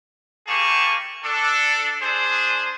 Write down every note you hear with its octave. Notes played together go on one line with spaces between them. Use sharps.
G3 A#3 G4 G#4 A5 C#6
D4 A4
D4 G#4 C5